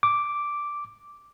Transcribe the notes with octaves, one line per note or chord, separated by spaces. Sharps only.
D6